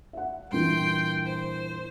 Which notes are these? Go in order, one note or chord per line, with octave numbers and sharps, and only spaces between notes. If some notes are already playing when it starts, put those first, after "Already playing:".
E5 F#5
G2 A#2 E3 G5 C6 G6
C5